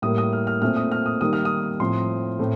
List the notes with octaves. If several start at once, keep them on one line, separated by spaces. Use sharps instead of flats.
A2 G3 A#3 D#6
D#6
F6
F6
A#2 A3 C4 F6
D#6
F6
D#6
D#3 G3 A#3 D#6
F6
D#6
A2 F3 C4 C6
A2 A3 C4